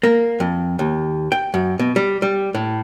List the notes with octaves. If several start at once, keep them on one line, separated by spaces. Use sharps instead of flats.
A#3
F2
D#2
G5
F#2
B2
G3
G3
A2